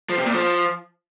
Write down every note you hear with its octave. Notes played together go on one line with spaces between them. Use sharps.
F3
C3
A#2
F3